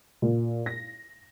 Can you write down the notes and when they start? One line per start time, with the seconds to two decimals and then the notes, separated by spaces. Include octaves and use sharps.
0.22 A#2
0.66 A#6